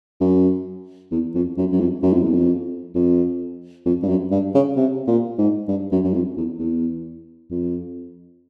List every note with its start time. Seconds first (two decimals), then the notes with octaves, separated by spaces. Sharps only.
0.21 F#2
1.12 E2
1.35 F2
1.58 F#2
1.72 F#2
1.80 F2
2.03 F#2
2.14 F2
2.24 E2
2.33 F2
2.95 F2
3.86 F2
4.03 G2
4.09 F#2
4.31 G2
4.55 C#3
4.77 C3
5.08 A#2
5.38 G#2
5.69 G2
5.92 F#2
6.04 F#2
6.14 F2
6.37 E2
6.59 E2
7.51 F2